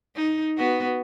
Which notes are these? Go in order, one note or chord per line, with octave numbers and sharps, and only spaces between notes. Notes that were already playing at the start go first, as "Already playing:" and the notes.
D#4
B3 F#4